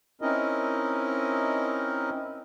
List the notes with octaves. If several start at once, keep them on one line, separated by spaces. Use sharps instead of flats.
C4 C#4 D#4 E4 A#4 D#5